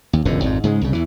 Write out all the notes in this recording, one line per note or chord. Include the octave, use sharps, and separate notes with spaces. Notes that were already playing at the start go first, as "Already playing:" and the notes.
D#2
E1 C#2 F#2 D3
G#1 F2 G#2
G#2 C#3 G#3
C2 C#3
E2 E3